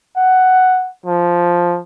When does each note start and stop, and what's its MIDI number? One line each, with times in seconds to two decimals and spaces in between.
0.16 0.90 78
1.06 1.79 53